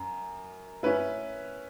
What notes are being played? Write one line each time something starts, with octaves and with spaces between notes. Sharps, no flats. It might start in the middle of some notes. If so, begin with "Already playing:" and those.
Already playing: F#2
C#4 E4 B4